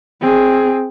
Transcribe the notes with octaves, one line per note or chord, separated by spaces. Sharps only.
C4 G#4